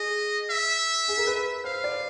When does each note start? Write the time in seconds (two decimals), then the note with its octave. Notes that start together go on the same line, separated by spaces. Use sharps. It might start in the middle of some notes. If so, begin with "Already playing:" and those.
Already playing: G#4 D#5
0.50 E5
1.08 G#4
1.18 A#4
1.27 B4
1.64 C5 F5
1.84 D5